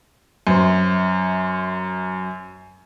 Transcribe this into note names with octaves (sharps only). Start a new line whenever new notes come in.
F#2 C5